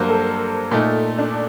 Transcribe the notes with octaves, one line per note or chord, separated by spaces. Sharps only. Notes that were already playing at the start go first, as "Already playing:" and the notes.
Already playing: G2 F#3 A#3 A#4 C5
A4
A#2 A3 D#4
D4